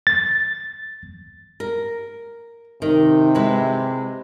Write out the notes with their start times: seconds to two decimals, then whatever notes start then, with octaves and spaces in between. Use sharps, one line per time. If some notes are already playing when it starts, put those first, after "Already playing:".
0.07 A6
1.60 A#4
2.82 C3 D#3
3.35 G#3 E4 B4